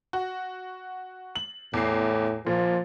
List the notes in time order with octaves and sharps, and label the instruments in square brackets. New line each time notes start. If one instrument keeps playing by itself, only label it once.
[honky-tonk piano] F#4
F#7
[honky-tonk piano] E2 C7 [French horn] A2
[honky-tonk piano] A#2 [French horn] F3